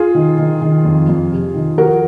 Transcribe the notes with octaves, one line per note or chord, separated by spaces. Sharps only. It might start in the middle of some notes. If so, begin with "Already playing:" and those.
Already playing: F4 G#4
D#3
D#3
D#3
F2
F2
C3
D#3
F3 F#4 A#4